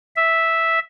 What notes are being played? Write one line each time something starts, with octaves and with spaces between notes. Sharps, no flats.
E5